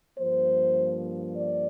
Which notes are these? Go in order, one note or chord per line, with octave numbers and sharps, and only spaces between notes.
G2 F3 A#3 C5
D5